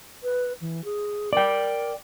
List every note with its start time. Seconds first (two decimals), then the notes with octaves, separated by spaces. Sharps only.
0.23 B4
0.61 E3
0.85 G#4
1.33 A#4 D5 G5